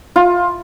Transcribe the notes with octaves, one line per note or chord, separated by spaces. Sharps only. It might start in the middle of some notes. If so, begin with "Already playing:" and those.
F4